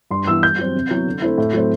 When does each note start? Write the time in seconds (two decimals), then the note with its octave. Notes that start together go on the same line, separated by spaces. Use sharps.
0.11 G2 C6
0.27 E3 G3 B3 E4 E6
0.43 G2 G6
0.59 F#3 C4
0.75 C3
0.91 F#3 B3 E4
1.06 D3
1.22 A3 C4 E4
1.38 A2
1.53 F#3 A3 C4